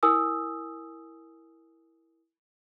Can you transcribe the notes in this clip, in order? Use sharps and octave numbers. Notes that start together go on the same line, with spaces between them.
E4 A#4 G#5 D#6 E6